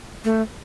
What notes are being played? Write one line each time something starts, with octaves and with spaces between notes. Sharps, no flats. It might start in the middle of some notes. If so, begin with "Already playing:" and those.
A3